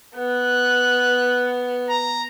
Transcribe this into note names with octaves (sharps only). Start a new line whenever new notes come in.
B3 F#6
A#5